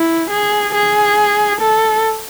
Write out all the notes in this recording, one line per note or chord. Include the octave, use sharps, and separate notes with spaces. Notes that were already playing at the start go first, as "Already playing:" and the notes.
Already playing: E4
G#4
G#4
A4